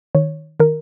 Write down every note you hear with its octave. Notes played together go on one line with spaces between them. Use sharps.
D#3 C#5
D#3 A#4